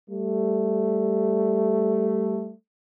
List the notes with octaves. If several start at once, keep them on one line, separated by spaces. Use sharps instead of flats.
G3 A3